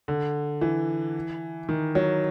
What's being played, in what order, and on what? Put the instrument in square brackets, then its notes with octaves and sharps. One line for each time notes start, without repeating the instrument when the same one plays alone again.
[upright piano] D3
E3
D#3
F#3